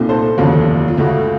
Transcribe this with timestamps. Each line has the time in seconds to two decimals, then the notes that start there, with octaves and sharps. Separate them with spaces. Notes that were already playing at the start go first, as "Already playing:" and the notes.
Already playing: C2 A#2 A3 C4 D#4
0.09 A4 C5
0.38 F1 D#2 C#3 F#3 F4 A4
0.88 F4
0.97 C#2 C#3 A3 F#4